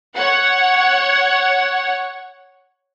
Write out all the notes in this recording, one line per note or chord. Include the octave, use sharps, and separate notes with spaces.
C#5 F#5